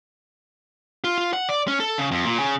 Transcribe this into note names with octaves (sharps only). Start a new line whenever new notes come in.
F4
F4
F#5
D5
C#4
A4
C#3
F2
A#2
C#3